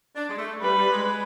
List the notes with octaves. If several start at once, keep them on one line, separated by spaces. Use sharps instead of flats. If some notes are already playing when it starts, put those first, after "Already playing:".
D4
G#3
A3
G3 B4
G3
G#3